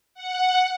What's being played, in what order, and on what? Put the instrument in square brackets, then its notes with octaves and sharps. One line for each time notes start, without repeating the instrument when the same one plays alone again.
[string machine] F#5